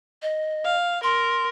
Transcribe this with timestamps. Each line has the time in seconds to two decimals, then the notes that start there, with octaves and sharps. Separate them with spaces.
0.22 D#5
0.64 F5
1.03 A#4 C6